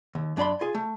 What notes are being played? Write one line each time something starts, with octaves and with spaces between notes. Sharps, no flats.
D#2
F#2 D4 D5 B5 C6
F4 G#4
A3